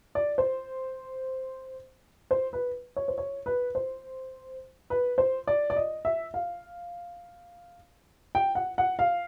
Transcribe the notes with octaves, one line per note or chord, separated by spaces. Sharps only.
D5
C5
C5
B4
C#5
C5
C#5
B4
C5
B4
C5
D5
D5
D#5
E5
F5
G5
F#5
F#5
F5